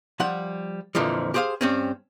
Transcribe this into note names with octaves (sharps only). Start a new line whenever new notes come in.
F3 G3 F#5
F2 A#2 D3 E3 F3
G4 G#4 C5 E5 F5
G2 C4 C#4